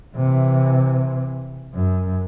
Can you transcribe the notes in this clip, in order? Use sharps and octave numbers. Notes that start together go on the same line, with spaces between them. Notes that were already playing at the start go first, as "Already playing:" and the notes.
C3 E3
F#2